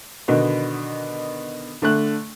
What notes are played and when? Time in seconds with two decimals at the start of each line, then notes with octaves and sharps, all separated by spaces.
0.28 B2 D3 D#3 B3
1.82 D3 A3 F#6